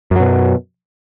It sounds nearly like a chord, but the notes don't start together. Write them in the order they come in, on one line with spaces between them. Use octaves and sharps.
F#2 F#3 B2